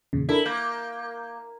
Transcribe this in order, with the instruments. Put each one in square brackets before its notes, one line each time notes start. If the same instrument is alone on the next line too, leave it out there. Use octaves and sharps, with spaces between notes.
[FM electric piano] E2 A#2 C#3
[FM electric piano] D4 A4 A#4 [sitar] E4
[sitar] A#3 [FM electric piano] G6